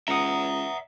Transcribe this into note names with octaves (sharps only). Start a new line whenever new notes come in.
C#2 E5 F#5 A#5 D#6